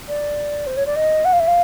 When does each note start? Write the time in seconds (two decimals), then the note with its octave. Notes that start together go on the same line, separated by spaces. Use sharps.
0.08 D5
0.66 C5
0.76 C#5
0.86 D5
0.96 D#5
1.24 F#5
1.32 F5
1.39 E5
1.47 F5